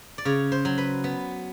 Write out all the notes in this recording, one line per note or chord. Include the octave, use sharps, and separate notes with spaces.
D5
C#3 C#5
C5
F#3
B4
B3